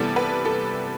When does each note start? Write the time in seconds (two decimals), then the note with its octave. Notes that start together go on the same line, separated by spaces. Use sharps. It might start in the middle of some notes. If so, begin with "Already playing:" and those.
Already playing: C3 E3 G3 B3 A4
0.16 B4
0.45 A4